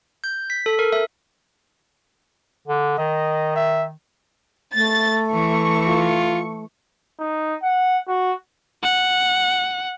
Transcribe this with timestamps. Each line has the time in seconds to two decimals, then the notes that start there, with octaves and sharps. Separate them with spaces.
0.24 G6
0.50 B6
0.66 A4
0.79 A#4
0.92 E5
2.68 D3
2.98 D#3 D#5
3.56 E5
4.75 A3 A6
5.33 E3 C#6
5.87 F4
7.20 D#4
7.63 F#5
8.08 F#4
8.83 F#5